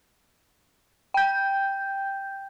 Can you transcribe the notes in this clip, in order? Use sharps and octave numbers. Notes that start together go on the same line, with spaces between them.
G5 G6